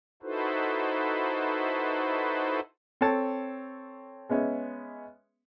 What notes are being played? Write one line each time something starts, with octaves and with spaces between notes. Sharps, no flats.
D#4 E4 F#4 A4 B4 C5
C4 A4 C#5 A5
G#3 B3 C#4 E5